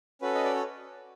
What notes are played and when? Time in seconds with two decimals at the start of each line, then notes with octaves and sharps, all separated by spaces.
0.21 C#4 F#4 A4 B4
0.35 D#5
0.44 D5
0.55 C#5